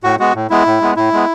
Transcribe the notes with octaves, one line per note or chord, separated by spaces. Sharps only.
A2 F#4
G#3 B3 F#4
A2
G#3 B3 E4
A2
G#3 B3
A2 E4
G#3 B3